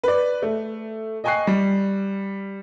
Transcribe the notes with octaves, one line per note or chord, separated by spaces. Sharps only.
B4 D5
A3
D#5 G5 G#5 C#6 F#6 C7
G3